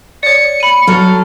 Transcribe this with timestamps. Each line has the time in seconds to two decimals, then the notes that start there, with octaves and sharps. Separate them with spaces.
0.23 C#5 D5 C#7
0.60 B5 D#7
0.87 F#3 A4 F6